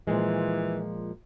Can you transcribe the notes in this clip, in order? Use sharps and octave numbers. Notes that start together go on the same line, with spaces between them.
A#2 E3 F3 G#3